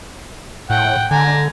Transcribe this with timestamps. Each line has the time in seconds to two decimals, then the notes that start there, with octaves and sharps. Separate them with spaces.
0.70 A2 F#5 G5
1.11 D3 G#5 A#5